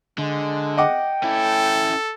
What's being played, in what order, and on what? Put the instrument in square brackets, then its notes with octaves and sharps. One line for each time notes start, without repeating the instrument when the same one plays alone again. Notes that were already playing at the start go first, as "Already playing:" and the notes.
[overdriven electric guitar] D3 [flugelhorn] G#3
[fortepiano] D#5 F#5 D6 [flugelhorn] G5
[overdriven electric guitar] C#4 E4 [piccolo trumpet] A4